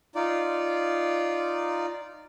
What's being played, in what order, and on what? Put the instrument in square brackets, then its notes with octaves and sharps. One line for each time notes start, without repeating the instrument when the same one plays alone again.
[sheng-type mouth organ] D#4 F4 D5